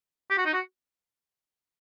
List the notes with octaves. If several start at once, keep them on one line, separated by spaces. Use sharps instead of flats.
G4
F#4
D#4
F#4